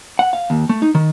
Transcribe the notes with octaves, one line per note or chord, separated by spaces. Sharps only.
F#5
F5
D#2
A3
D#4
D#3